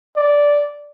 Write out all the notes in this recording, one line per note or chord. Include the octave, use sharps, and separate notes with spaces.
D5